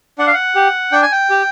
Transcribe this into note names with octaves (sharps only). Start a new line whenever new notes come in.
D4 F#5
F5
F#5
G4
D4 G5
G#5
G5
G4